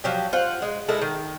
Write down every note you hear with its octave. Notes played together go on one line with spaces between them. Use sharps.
F3 F#3 G4
F4 C5 F#5
G#3
G#3 E4 A4 A#4
D#3